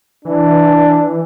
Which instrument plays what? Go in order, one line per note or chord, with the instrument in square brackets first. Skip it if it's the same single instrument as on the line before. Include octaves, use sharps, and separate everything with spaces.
[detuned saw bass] E3 [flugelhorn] D4